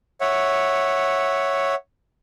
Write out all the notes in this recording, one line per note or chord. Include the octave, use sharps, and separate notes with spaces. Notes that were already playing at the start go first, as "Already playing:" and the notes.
C#5 E5 F#5